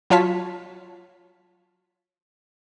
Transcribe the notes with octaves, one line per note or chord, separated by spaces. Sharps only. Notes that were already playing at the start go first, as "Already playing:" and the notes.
F#3 F4 C#5 A5 F6 B6